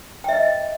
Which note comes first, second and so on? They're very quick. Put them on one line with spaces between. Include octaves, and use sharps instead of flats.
G5 E5 D#5